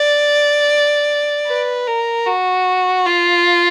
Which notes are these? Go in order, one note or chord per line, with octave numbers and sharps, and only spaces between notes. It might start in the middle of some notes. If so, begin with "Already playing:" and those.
Already playing: D5
B4
A#4
F#4
F4